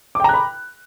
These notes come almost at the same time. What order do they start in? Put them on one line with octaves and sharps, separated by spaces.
D6 G5 A#5 F#6 B5